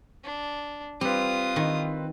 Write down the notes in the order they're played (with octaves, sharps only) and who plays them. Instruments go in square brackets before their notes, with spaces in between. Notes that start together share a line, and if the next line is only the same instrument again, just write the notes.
[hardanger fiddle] D4
[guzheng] G3 [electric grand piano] C4 B4 [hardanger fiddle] F4 D#6
[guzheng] D#3